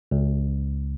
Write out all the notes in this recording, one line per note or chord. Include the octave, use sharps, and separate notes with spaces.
C#2